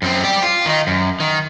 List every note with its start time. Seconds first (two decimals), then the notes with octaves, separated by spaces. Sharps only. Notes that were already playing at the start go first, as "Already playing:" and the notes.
0.02 F#2 C4
0.23 G4 D5
0.42 F4
0.66 D#3 D#4
0.87 F#2
1.20 D#3